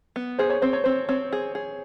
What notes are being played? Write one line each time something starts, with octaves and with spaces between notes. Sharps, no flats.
B3
G#4 C5
C#5
C4 C5
C#5
C4 C5
C4 C#5
G#4
G#4